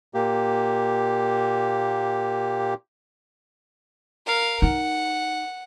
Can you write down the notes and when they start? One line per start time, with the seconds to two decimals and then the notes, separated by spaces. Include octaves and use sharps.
0.14 A#2 A#3 G4
4.26 A#4 F5
4.62 D#4 F#5